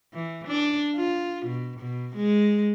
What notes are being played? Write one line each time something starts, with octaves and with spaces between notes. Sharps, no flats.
E3
D4
F4
B2
B2
G#3